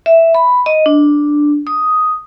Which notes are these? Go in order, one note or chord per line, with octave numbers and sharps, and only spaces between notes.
E5
B5
D#5
D4
D#6